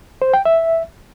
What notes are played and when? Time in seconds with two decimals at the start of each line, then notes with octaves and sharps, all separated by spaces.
0.22 C5
0.34 G5
0.45 E5